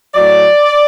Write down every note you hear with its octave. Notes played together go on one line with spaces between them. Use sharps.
A2 F#3 D5